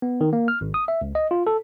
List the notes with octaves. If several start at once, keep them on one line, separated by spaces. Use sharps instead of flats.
B3
D#3
A#3
F6
G#1
D#6
E5
C#2
D#5
F4
A4